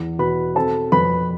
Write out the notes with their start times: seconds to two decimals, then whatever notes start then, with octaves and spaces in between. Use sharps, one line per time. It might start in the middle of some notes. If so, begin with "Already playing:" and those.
Already playing: E2
0.19 B2 B4 B5
0.55 C4 A4 A5
0.92 F2 B4 B5